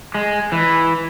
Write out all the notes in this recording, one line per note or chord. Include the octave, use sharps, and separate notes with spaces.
G#3
E3